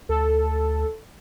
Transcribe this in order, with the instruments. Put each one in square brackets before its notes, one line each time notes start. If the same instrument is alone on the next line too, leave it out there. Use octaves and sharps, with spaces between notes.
[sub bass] D2 [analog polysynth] A4